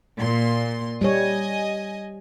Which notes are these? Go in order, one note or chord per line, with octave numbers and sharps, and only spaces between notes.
A#2 C6
G3 C#5 D#5 G#5